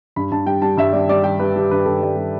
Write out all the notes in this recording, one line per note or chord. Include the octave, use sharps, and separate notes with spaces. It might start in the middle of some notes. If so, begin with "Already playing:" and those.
G2 B5
G2 A5
G3 G5
G3 A5
G2 E5
G3 D5
G3 D5
G3 G5
G3 B4
G3
G2 B4
G2 A4
G3 D5
G3